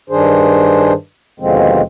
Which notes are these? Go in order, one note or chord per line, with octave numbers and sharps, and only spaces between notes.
G2 D#3 D4 G#4 C5
D#2 B2 D3 F3 G#3 C4